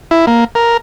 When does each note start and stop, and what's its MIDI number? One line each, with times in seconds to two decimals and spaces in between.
0.11 0.26 64
0.27 0.44 58
0.55 0.77 70